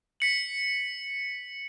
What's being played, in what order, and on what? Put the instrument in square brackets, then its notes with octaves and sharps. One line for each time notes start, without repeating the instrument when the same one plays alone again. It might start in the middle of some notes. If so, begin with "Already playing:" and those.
[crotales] B6 C#7 F#7